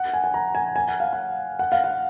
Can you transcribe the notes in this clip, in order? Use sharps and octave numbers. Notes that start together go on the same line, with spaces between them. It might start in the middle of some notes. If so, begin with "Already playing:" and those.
Already playing: F#5
G#5
G#5
A#5
G#5
G#5
F#5
F5
F#5
F#5
F5
F#5